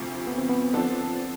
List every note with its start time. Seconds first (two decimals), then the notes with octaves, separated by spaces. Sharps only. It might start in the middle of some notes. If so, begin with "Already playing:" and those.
Already playing: D2 C3 F3 A3
0.27 B3
0.38 C4
0.49 B3
0.73 F3 B3 C4 D4 A4